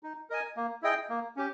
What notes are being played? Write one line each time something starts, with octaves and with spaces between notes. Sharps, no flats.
D#4
A#4 D#5 G#5
A#3
E4 G#4 D#5 G5
A#3
C#4 G4